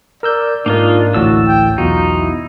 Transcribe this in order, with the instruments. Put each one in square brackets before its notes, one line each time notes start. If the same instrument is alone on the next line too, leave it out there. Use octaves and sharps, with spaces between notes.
[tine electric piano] A#4 E6 G6 [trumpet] D5
[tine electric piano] G#2 A#4 [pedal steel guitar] A#3 D#4 F4 [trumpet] D4
[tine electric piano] A1 D2 A2 [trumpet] F#4 [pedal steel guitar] A5 E6
[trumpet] G5
[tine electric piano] B1 E2 F#4 [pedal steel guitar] D#4 [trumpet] F4
[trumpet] E4